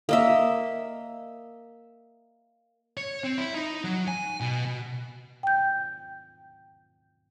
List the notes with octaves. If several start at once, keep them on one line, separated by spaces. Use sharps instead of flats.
A#3 D#5 E5
C#5
C4
E4
D#4
F#3
G#5
B2
B2
G5 G6